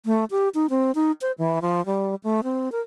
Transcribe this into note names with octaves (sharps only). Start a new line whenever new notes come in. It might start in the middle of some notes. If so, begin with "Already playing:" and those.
A3
G4
D#4
C4
D#4
C5
E3
F3
G3
A3
C4
A#4